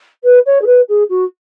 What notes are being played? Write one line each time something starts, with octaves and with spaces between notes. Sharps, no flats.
B4
C#5
G#4
B4
G#4
F#4